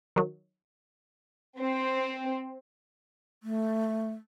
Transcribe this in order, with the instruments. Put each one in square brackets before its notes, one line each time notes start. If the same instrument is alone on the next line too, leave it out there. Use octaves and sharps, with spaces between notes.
[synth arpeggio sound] D#3 F#3
[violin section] C4
[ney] A3